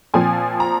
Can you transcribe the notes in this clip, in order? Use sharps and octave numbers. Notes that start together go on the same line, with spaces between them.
A#2 F3 C4 G#5
A#5